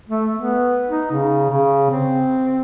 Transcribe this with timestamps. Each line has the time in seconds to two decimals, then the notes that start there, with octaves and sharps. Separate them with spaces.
0.09 A3
0.36 B3
0.88 D#4
1.11 C#3
1.50 C#3
1.90 C4